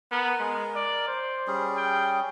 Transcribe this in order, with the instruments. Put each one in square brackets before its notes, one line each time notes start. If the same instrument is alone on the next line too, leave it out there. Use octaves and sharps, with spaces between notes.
[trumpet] B3 [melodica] A#4
[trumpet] G#3
D5
C5
[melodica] G3 C#4 G#4
[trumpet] G5